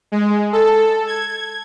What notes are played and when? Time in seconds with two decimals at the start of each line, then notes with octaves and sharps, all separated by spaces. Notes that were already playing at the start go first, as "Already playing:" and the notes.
0.12 G#3
0.53 A4
1.07 G#6